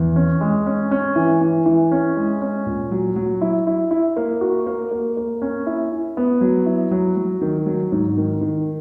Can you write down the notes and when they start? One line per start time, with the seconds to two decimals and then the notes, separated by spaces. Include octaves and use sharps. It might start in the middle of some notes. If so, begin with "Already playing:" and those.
Already playing: E2
0.16 C#4
0.41 G#3
0.66 C#4
0.91 C#4
1.16 E3
1.41 E3
1.66 E3
1.92 C#4
2.16 G#3
2.42 C#4
2.66 A#2
2.91 F#3
3.16 F#3
3.41 E4
3.67 E4
3.91 E4
4.17 A#3
4.41 F#4
4.66 A#3
4.91 A#3
5.17 A#3
5.42 C#4
5.67 E4
5.92 E4
6.17 B3
6.41 F#3
6.66 E4
6.91 F#3
7.17 F#3
7.41 D#3
7.66 F#3
7.92 G#2
8.17 D#3
8.41 D#3